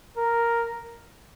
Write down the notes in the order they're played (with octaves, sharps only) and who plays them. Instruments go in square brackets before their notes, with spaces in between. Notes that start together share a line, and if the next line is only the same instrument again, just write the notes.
[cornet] A#4